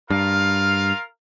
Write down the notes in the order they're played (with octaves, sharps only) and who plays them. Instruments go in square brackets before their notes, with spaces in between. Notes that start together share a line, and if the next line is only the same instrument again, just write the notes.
[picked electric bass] G2 [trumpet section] F4 A#4 F5